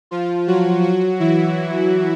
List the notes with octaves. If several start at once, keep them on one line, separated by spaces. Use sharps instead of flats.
F3 F4
F#3 F#4
F#3 F#4
E3 E4